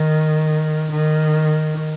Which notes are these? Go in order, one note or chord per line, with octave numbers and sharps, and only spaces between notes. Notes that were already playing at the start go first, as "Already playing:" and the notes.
Already playing: D#3
D#3